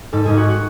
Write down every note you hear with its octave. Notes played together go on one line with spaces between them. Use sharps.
G#2 A4
G#2 G#4
F#4
F#4